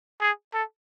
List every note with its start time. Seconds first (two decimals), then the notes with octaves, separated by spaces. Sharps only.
0.21 G#4
0.54 A4